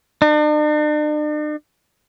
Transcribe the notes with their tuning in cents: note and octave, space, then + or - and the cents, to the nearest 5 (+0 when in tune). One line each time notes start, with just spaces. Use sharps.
D4 +45